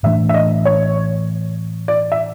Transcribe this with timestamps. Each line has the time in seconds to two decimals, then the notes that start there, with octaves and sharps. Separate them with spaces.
0.03 A2 E3 A3 D4 E5
0.29 E5
0.34 D#5
0.65 C#5
1.88 D5
2.12 E5